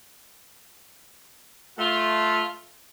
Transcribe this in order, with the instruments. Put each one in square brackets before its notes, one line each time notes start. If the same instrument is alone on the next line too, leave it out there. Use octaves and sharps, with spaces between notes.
[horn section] A3 F4